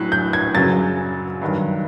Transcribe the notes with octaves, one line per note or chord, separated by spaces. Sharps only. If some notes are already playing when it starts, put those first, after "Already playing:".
Already playing: A2 F#3 F#6
G6
G#6
F#2 C#3 F#3 A6
G2 D#3 F#3